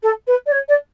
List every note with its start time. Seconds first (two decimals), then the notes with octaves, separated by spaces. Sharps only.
0.03 A4
0.27 B4
0.46 D5
0.51 C#5
0.68 D5